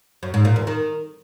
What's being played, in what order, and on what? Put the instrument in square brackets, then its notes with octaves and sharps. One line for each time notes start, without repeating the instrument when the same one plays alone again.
[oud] F#2
G#2
A#2
E2
D#3